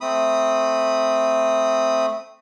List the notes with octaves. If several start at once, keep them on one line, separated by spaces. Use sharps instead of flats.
A3 C4 B5 D#6